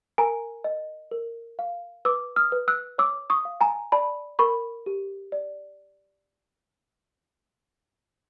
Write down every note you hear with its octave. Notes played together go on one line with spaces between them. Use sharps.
A#4 G#5 A#5
D#5
A#4
F5
B4 D6 E6
D#6 F6
B4
E6 F#6
C#5 D6 E6
C#6 D#6
F5
G#5 A#5
D5 A5 B5
A#4 B5 C#6
G4
D5